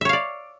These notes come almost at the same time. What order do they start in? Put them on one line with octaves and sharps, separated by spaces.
E5 C#5 F5 D5